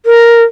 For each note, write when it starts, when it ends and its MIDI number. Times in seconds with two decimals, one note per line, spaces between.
0.06 0.44 70